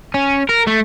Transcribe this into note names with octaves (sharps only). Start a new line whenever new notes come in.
C#4
A#4
A3